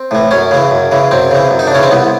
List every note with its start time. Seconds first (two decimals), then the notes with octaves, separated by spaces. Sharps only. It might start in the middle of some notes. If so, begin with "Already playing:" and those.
Already playing: C4
0.11 A2 E3
0.31 F#2 C#4
0.51 C#3 E3
0.71 F#2
0.91 C#3 E3
1.11 F#2 C4
1.31 C#3 E3
1.51 F#2
1.59 D#4
1.67 D4
1.71 C#3 E3 C#4
1.83 C4
1.91 C2 B3